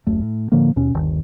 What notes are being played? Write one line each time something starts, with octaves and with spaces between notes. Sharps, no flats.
F#1 D#2 A3
A2
A2 D3 F3 A#3
D#2 B2 C#4
G1 D#2 D#3